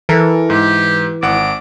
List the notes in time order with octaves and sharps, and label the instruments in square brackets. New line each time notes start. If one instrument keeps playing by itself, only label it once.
[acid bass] E3 [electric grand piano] A4 A#4
[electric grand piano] G#2 [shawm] G4
[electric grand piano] G#1 F#5 [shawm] D6